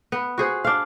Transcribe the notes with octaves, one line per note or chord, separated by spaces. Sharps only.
B3
F#4 G#4 C5
D4 F5